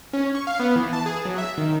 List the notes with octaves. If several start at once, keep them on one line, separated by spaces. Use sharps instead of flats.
C#4
C#6
F5
B3
E3
A5
G#4
F#3
E5
D#3